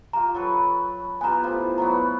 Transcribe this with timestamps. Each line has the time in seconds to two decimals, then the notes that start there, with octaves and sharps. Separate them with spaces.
0.13 F4 G4 A#5
0.35 F#3 A4 B4
1.21 B3 F4 G4 G#5 A#5
1.44 A2 F3
1.78 E3 F#3 B3 A#5